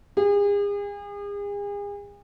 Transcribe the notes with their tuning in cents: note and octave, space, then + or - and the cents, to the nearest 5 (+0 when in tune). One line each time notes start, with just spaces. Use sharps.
G#4 -40